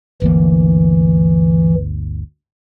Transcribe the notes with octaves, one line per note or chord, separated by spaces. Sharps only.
G1 D2 E3 A#3